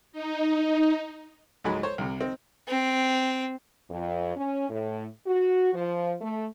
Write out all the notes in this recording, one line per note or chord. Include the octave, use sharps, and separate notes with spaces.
D#4
C#2 G#2 F#3 G#3 B5
C5 C#5
C2 C3
C4 D#4
C4
F2
C#4
A2
F#4
F3
A3